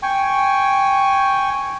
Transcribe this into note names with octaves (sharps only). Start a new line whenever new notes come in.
G5 G#5 C#6